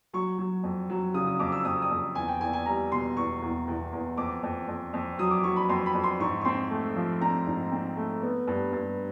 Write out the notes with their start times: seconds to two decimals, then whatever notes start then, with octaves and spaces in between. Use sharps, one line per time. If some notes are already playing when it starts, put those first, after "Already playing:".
0.13 F#3 C#6
0.38 F#3
0.63 F2
0.90 F#3
1.14 C#3 D#6
1.27 D#6
1.39 F2 D6
1.52 E6
1.65 F2 D#6
1.82 D#6
1.91 F2
2.15 E2 G#5
2.28 G5
2.40 E2 G#5
2.53 G#5
2.66 G3 A#5
2.92 B2 C6
3.17 E2 C#6
3.42 E2
3.67 E2
3.93 E2
4.18 F2 D6
4.43 F2
4.68 F2
4.93 F2
5.19 F#3 D#6
5.31 D6
5.44 F#3 C#6
5.56 B5
5.69 F2 C6
5.86 B5
5.94 F2
6.04 C6
6.20 G#2 C#6
6.41 C#6
6.45 C4 C6
6.70 A3
6.96 F3
7.21 C4 A#5
7.47 G#2
7.72 C4
7.97 A3
8.22 B3
8.47 G2
8.73 G2